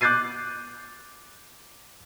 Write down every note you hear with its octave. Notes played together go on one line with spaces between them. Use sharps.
D6 F#6 G6 A6 C7 D#7